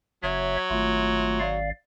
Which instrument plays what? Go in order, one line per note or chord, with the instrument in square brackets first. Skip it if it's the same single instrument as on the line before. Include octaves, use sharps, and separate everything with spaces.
[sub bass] F#1 [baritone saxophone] F#3 [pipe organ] C#5 E5
[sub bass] G#1 [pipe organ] A3 F4
[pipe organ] D5 F5